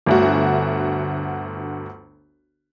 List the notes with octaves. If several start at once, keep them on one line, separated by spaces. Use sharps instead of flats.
G1 D2 F#4